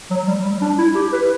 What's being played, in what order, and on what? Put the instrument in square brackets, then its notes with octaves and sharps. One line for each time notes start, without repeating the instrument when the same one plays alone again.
[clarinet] F#3
G3
G3
D4
E4
G4
B4